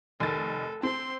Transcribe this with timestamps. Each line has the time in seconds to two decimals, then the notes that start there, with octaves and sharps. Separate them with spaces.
0.20 F1 D#3 A4 A6
0.83 C4 C6